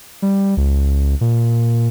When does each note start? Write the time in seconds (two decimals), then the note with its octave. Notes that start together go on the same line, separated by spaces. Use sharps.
0.22 G3
0.57 C#2
1.21 A#2